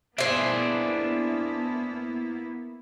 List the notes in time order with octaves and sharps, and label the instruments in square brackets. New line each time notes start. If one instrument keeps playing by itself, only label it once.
[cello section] A#3 B3 E4 [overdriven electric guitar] D4 G#4 [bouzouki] C5 E5